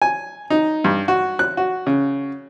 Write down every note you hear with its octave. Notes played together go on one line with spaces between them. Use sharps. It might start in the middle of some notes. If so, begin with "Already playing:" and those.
G#5
D#4
G2
F#4
F#6
F#4
C#3